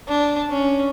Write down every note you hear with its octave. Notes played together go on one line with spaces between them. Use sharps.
D4
C#4